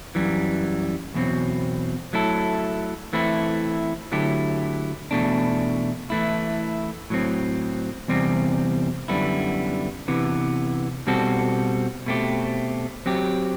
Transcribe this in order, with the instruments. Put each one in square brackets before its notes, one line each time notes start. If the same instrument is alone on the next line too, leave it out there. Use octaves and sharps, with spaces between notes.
[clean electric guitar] F#2 E3 G3
E2 B2 F#3 C4
F#3 A3 E4 A4
E3 A3 C4 E4
D3 F#3 A3 E4 G4
E2 B2 A3 D4
E3 A3 E4
A2 F#3 C4
E2 C3 G3 C4
F#2 D3 G3 B3 E4
C3 E3 B3
B2 G3 C4 F#4 A4
B2 A3 C4 G4
F#3 C4 G4